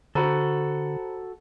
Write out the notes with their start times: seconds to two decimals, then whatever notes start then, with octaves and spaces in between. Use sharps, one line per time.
0.15 D3 F#4 A4 C5 A#5 B5